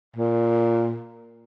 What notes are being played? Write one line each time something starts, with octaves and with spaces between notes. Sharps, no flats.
A#2